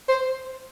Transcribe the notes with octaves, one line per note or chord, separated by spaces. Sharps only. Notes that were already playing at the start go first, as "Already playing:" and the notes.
C5